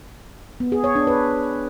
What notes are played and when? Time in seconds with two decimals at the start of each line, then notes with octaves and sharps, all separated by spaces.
0.60 B3
0.72 G#4
0.84 C#5
0.95 D4
1.07 B4